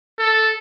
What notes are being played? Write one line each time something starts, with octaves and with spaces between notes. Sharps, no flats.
A4